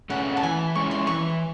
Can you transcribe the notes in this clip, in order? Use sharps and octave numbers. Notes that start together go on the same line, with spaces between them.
A3 C#4 G#4 F#5
A5
E3 G#5
G#3 C#4 E4 C#6
C6
E3 C#6